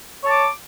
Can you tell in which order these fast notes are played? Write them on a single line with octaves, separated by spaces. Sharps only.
C#5 A5 D6